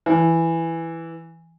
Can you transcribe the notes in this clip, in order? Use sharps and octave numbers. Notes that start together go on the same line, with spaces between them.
E3